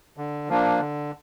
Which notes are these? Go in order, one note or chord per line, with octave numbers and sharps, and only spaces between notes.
D3
F3 A#3 D4
D3